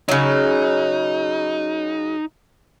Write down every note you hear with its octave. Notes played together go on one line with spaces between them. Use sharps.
C#3 F#3 D#4